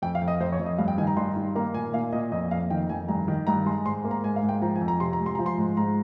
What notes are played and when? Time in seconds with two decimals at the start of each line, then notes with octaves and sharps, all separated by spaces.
0.02 F2 G5
0.15 F5
0.22 F2
0.28 D#5
0.40 F2 C5
0.53 C#5
0.59 F2
0.66 D#5
0.78 G2 F5
0.88 G5
0.98 D#3 G#5
1.07 A#5
1.17 G2 C6
1.36 D#3
1.55 A#3 A#5
1.74 A#2 G#5
1.93 A#2 F5
2.13 A#2 D#5
2.32 F2 D#5
2.51 F2 F5
2.70 D#3 G5
2.89 F2 G#5
3.08 G2 A#5
3.28 D#3
3.47 G2 A#5
3.66 G#3 C6
3.86 G#2 C6
4.05 A#3
4.11 A#5
4.23 G#2 G#5
4.36 F5
4.43 G#2
4.49 G5
4.62 F3 A#5
4.75 G#5
4.81 F2
4.88 A#5
5.00 C3 C6
5.13 A#5
5.19 G#3
5.26 C6
5.35 F3 A#5
5.46 C6
5.58 G#2
5.77 G#2 A#5